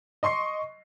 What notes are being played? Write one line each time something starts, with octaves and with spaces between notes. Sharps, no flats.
D#5 C6 C#6 C7